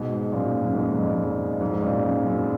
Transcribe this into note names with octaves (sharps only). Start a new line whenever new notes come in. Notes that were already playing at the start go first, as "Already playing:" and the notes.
Already playing: G#2 B2
F#2 A#2
F#2
F2 G#2
F2
F2
F2 G#2
F#2 A#2
F#2
F#2